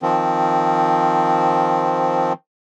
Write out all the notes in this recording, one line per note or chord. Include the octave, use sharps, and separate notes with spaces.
D#3 F3 C4